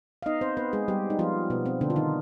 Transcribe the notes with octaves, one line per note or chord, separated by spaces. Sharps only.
F5
B3 D#4 D#5
C4 C5
B3 B4
G#3 G#4
G3 B3 G4
D#4
F3 B3 F4
B2 B3
C4
D3 B3 D4
F4
D#3 D#4